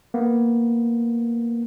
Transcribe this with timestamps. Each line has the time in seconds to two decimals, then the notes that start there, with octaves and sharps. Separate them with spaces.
0.14 A#3 B3